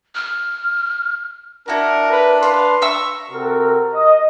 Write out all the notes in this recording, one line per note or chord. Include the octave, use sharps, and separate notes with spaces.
F6
D4 E4 F#4 A#4
B4
B4 F5 C6
E5 A#5 C#6 E6
C3 C4 F#4 A4 A#4
D#5